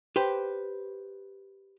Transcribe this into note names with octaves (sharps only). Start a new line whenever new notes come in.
G4 B4 C5